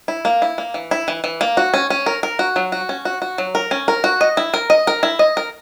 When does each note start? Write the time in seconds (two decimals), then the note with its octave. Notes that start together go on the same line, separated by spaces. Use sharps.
0.08 E4
0.25 A#3
0.42 E4
0.58 A#3
0.74 E3
0.91 E4
1.08 E3
1.24 E3
1.41 A#3
1.57 F#4
1.74 C#4
1.90 C#4
2.06 A#4
2.23 A#4
2.39 F#4
2.56 F#3
2.72 F#4
2.89 C#4
3.05 F#4
3.22 F#4
3.38 F#3
3.55 A#4
3.71 C#4
3.88 A#4
4.04 F#4
4.21 D#5
4.37 E4
4.54 A#4
4.70 D#5
4.87 A#4
5.03 E4
5.19 D#5
5.37 A#4